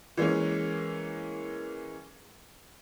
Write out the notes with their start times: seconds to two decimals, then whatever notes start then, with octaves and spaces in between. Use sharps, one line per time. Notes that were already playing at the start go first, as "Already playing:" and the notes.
0.17 E3 G#3 A#3 C#4